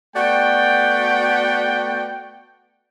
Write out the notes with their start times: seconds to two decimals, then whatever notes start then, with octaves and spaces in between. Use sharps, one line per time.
0.16 A3 B3 F#4 D5 G5